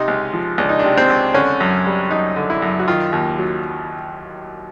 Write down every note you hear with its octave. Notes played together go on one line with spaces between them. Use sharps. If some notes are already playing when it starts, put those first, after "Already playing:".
Already playing: C3 D#4
C#2
F3
C#2 D4
D#4
C3 D4
C4
C#2
D3 C#4
F#2
G3
F#2 D#4
D3
E4
F#2
F#4
D#3 F4
D#2
F#3